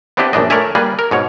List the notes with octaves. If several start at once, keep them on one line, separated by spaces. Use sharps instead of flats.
B3 C4 D4 E4 G4 B4
A#1 F#2 E3 D4 D#5
A3 A#4 C#5 D5 E5 G#5
G3 A#3 G#4 B4
A#4
G#2 B2 C#5